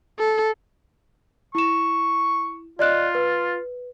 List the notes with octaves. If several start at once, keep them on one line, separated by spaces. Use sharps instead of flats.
A4
E4 C#6 E7
F4 D5 D#5 F#6
B4